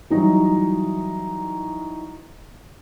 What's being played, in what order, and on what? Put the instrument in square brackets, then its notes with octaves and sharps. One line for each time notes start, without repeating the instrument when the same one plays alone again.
[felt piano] E3 F#3 G3 D#4